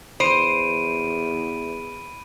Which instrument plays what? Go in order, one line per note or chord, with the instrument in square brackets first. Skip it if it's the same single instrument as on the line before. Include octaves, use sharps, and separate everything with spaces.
[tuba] E2 [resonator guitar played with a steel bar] C5 [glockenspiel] B5 D7 D#7